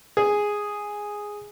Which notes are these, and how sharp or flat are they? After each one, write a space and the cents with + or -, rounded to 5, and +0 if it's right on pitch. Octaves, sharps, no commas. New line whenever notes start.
G#4 -5